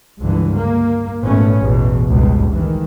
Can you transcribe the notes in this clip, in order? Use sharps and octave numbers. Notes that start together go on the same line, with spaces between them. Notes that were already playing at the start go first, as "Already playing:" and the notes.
C#2 G2 D3 E3
A#3
G#1 A#2 A3 B3 C#4
A1 E2 B2
F#1 C#2 G2 B2
D#3 E3